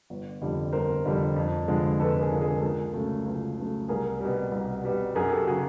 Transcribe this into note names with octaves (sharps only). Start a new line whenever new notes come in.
G1
F2 D3 G3
G1 A#4 C5
F2 D3 G3
F2
D3 F3 G#3
F2 A4 B4
G#4 A#4
D3 F3 G#3
G#4 A#4
C#2 G#4 A#4
C#3 F#3 A3
C#2
C#3 F#3 A3
C2 G#4 A#4
B2 G3
C2
B2 G3
F#2 G#4 A#4
G4 A4
C#3 F#3 F#4 G#4